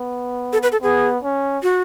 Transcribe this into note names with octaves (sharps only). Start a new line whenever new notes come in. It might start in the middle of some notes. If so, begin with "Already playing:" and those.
Already playing: B3
A4
B4
A4
B3 G#4
C#4
F#4